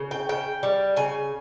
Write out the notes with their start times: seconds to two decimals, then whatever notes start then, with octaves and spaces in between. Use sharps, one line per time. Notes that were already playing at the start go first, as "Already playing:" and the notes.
Already playing: C#3
0.11 G5
0.29 C#3 G5
0.63 G3
0.96 C#3 G#5